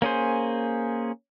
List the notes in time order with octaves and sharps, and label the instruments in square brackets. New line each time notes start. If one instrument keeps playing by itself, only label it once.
[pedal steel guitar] A#3 C#4 G#4 C5